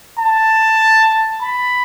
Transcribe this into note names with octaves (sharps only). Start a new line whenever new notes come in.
A5
B5